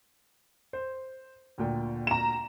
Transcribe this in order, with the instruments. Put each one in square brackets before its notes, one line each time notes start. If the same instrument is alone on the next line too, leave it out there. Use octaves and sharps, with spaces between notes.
[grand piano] C5
D2 A#2 G5
[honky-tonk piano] A#5 E7